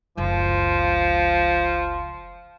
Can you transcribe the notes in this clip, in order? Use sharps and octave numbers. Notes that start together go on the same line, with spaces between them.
F#1 C#2 F3